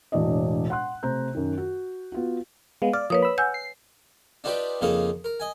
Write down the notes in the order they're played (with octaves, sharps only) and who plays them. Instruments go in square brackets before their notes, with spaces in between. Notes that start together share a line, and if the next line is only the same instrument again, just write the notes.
[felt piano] E1 A2 D4 D5 D#5
F#5 C6 F#6
C3 A3 C5 A#5 G6
F#2 D#3
F#4
B3 F4 F#4
[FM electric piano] G#3 B3 [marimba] F5
[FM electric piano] D5 [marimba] F6
[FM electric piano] F3 A#3 [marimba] B4 C#5 D#6
[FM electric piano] B5 E6
[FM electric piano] F#5 [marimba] G#5 E6 G6
[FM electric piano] C7
[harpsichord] D4 D#4 F4 G4 B4 D5
F2 C#3 A#3 D#4 F5 D#6
A#4
D#5 G#5